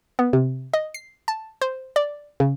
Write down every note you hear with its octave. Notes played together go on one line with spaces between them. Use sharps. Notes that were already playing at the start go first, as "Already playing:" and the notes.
B3
C3
D#5
C7
A5
C5
D5
C#3